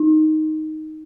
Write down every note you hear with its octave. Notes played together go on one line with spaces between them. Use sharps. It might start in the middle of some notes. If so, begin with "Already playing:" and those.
Already playing: D#4